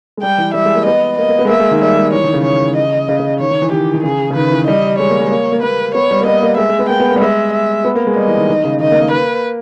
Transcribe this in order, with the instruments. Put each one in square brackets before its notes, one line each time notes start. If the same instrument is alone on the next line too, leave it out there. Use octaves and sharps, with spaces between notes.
[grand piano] G#3
[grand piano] G3 [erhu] G5
[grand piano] E3
[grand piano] G3 [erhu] E5
[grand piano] G#3
A#3
[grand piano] B3 [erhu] D#5
[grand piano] A#3 [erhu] D#5
[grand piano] A#3
B3
G#3
[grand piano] A#3 [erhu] E5
[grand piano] G#3
D#3
[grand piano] G3 [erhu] E5
[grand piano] G#3
[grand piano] E3 [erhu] C#5
[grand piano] D#3
C#3
[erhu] C#5
D#5
[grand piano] C#3
C#3
[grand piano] D#3 [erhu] C#5
[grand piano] D#3
E3
[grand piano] D#3 [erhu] G4
[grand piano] D#3
[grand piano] C#3 [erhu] G#4
[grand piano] C#3
[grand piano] D#3 [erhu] B4
[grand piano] E3
[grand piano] G3 [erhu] D#5
[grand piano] G#3 [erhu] C#5
[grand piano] A#3
G#3
[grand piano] A#3 [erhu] C#5
[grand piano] A#3
[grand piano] A#3 [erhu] B4
[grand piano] B3 [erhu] C#5
[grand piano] G3
A#3
[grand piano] B3 [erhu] D#5
[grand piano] A#3
[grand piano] G#3 [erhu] E5
[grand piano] G#3
B3
[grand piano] A#3 [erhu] G5
[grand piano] B3
A#3
G3
[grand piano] G#3 [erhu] E5
[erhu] E5
[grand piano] B3
A#3
G#3
[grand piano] G3 [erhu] D#5
[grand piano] E3
D#3
D#3
C#3
[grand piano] D#3 [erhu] D#5
[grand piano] A#3
A#3
[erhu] B4